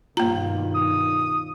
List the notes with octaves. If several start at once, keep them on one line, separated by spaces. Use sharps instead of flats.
G2 B2 D#3 A#3 F4 A#5
D#6